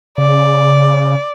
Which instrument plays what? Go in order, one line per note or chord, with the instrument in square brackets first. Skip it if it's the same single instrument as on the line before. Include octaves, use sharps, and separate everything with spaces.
[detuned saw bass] C#3 [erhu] D5